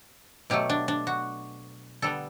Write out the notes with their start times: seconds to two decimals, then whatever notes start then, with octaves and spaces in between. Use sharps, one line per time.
0.50 B2 F#3 A3 G4
0.70 D4
0.88 D4
1.07 F#4
2.02 D3 G3 B3 A4